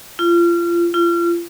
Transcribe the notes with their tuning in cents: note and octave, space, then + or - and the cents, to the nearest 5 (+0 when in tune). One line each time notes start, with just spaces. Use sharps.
F4 -30
F4 -35